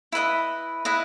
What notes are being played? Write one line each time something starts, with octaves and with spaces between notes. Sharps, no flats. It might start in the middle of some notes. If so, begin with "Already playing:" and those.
E4 B4 D#5
E4 B4 D#5